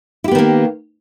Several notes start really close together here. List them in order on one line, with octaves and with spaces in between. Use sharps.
E4 G4 B3 D#3 A#3